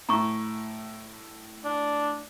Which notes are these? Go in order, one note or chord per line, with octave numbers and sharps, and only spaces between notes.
A2 A#5 C#6
D4